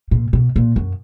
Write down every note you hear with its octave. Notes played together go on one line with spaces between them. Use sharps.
A#2
B2
A#2
F#2